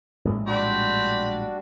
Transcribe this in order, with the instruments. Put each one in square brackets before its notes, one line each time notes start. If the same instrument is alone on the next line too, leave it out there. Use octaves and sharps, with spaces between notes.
[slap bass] A#1 A2 G#3
[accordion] G3 D4 F#4 [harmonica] C4 D5 B5